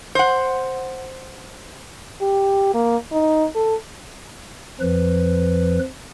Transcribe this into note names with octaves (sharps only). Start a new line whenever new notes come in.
C5 F#5
G4
A#3
D#4
A4
F2 F3 B4